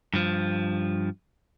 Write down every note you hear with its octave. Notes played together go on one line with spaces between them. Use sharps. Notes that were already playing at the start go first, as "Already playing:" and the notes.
G2 F3